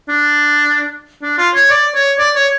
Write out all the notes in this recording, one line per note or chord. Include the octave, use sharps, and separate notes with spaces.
D4
D4
F4
C#5
D5
C#5
D5
C#5